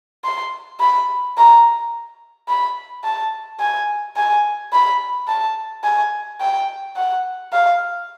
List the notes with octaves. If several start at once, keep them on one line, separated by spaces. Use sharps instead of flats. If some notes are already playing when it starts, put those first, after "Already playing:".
C6
B5
A#5
B5
A5
G#5
G#5
B5
A5
G#5
G5
F#5
F5